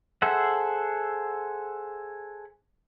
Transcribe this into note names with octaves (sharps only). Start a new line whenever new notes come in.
G#4 A4 C5 E5 F#5